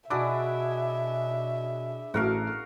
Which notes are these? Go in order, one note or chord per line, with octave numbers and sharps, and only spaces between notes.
B2 D4 E4 F#4 G#4 E5 D6
A1 A3 F#4 A#4 F5